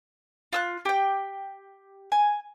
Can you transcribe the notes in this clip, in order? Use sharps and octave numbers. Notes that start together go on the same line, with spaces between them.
F4 E6 F#6
G4 G5
G#5